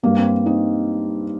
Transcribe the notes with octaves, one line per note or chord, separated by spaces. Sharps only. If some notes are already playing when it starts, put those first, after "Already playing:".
G2 G3 A#3
C4
C4 D#4